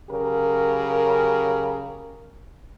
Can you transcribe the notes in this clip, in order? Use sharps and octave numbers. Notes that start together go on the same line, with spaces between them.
C#3 F#3 G4 A#4